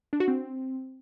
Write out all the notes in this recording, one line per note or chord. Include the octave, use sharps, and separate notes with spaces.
D4
F#4
C4